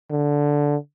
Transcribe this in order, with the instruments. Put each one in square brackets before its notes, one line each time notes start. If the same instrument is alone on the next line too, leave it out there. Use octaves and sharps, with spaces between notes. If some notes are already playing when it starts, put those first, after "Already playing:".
[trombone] D3